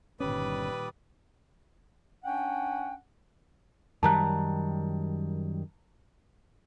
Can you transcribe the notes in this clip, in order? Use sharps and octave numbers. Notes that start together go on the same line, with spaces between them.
G1 A#2 D#3 G3 C#4 B4 D5 D#6
C#4 D4 F#5 G5
F#2 D#3 G3 A5 A#5 F#6